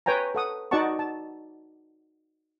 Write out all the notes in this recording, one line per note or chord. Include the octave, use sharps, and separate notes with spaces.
B4 C#5 G5 G#5 A#5
A4 F#5 D#6
D#4 F#4 D5 F#5 A5 C#6
A5